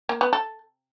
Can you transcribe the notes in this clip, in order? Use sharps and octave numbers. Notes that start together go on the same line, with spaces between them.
A#3
B3
A4